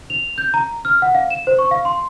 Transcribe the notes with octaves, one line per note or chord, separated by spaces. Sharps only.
F7
G6
A#5
F6
F#5
F5
E7
C5
C#6
F5
C6